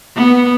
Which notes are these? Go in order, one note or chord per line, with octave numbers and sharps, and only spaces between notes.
B3